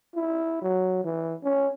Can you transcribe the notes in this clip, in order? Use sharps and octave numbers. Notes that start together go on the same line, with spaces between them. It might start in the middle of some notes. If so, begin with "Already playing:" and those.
E4
F#3
E3
C#4